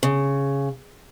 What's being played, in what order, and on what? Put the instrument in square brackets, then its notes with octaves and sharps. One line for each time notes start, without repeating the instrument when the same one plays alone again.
[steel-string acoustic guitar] C#3